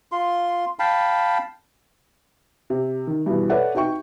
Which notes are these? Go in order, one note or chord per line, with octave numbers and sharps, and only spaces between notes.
F4 C6
F5 G5 A5 B5
C3
D#3
G2 B2 E3
A4 B4 C#5 D5 E5 F#5
D#4 F#4 E5 G5 C#6